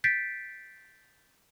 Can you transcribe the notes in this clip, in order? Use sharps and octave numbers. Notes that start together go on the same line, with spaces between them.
G6 A6 B6 C7 D7